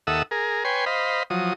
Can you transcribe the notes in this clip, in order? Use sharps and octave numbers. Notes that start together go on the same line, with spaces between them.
D#2 A4 E5 F#5 D#6 E6
G#4 A#4
B4 C#5 G5 G#5 C6
C5 D#5 F5 B5
F3 F#3 D#6